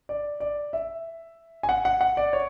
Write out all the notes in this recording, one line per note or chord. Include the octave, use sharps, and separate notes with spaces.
D5
D5
E5
G#5
F#5
F#5
F#5
D5
C#5